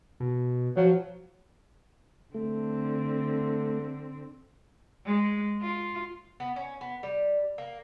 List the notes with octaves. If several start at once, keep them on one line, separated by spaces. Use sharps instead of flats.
B2
F3 F#3
D3 A3 C4
G#3
F4
B3
C#4
B3
G3
A#3